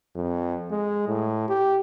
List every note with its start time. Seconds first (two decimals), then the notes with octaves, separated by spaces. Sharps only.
0.15 F2
0.71 G#3
1.08 A2
1.49 G4